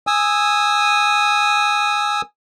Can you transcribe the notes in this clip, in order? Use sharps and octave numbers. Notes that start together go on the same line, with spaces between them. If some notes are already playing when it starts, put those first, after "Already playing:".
G#5 D#6 E6